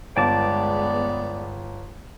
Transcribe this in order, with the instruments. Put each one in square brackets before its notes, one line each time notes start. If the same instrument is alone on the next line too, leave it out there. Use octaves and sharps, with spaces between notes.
[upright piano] G1 [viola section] G#3 B3 [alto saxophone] D5 [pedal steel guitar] G5 A5 D6